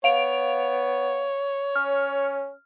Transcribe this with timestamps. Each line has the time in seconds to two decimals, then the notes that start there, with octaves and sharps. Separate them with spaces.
0.04 B3 C#5 F5 D7 F7
1.76 C#4 F6